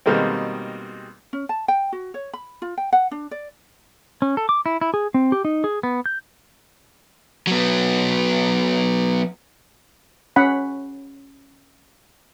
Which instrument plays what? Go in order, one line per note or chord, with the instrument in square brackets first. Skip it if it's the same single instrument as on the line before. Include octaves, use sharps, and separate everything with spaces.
[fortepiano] B2 D#3 G3 G#3 A#3 C4
[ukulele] C#4
A5
G5
F#4
C#5
B5
F4
G5
F#5
D4
D5
[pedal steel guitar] C#4
A4
D6
E4
E4
G#4
C4
G4
D#4
G#4
B3
G6
[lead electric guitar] F#3 B3
[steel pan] C#4 F#5 B5